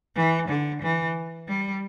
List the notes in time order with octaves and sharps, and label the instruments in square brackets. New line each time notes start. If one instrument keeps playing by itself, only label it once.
[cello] E3
D3
E3
G3